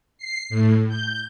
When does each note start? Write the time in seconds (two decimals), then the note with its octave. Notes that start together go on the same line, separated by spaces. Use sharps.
0.18 C7
0.50 A2
0.89 G6